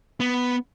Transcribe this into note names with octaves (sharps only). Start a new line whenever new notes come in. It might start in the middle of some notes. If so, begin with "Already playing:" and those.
B3